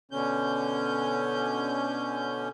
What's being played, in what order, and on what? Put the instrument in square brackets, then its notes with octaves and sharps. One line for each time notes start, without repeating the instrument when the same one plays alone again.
[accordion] B2 D3 C#4 G6